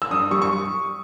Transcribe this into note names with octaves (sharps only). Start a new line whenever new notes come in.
E6
G2 D#6
G3 C#6
C#6